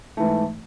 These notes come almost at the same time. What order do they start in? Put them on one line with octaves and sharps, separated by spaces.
A3 E3 G#2